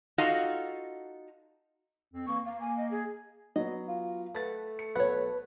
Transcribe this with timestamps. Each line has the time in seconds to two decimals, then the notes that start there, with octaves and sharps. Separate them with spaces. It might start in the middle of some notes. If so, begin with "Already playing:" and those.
0.18 D#4 F4 F#4 A4 D#5 F5
2.14 F2 C4
2.27 E3 A#3 C#6
2.45 A#3 F5
2.61 G#5
2.78 D#5
2.91 G#4
3.56 F#3 B3 D#5
3.88 F4
4.35 A3 B4 F#5 A6
4.79 C#7
4.96 B1 B4 C#5 F#5